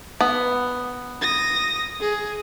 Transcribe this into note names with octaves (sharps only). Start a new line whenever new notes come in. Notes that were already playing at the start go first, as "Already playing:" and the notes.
B3
D#6 A#6
G#4